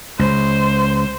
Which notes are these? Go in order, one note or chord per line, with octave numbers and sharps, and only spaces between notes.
C#2 C5